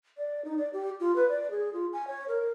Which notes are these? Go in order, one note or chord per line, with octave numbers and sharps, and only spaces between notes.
D5
D#4
D5
G4
F4
B4
D5
G#4
F4
G#5
C#5
A#4